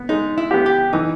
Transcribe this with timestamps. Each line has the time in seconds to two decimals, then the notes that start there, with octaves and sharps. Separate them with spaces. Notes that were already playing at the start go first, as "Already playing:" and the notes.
Already playing: B3
0.09 G#3 D#4
0.38 E4
0.51 B3 G4
0.66 G4
0.93 E3 D#4